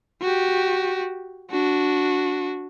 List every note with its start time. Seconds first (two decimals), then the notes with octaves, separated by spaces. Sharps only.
0.22 F#4 G4
1.51 D4 F#4